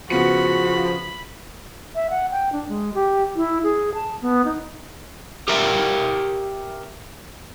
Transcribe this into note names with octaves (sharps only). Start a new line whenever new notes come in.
C#3 F3 B3 F#4 B5 C#7
E5
F#5
G5
D4
G#3
G4
E4
G#4
A5
B3
D#4
G4 A#4 E5 G5